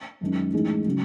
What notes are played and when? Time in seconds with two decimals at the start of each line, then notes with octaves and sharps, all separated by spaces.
0.21 F#2 D#3 G#3 C#4
0.53 A1 A2 G#3 D#4 G#4
0.86 C#3 F#3 C#4